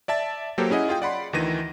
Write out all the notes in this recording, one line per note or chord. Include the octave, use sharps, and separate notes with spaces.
D5 E5 A5 A6
F#3 A#3 G4 A4 C5 C#5
C#4 E4 G#4 D#5 F#5
F4 G#4 G5
D5 F#5 B5 C6
D2 D#3 E3 A#6 D#7